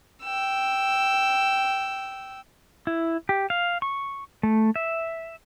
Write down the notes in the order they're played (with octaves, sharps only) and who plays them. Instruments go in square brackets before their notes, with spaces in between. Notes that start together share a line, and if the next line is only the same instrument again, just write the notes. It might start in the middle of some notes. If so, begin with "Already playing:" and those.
[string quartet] G5 E6
[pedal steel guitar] E4
G4
F5
C#6
A3
E5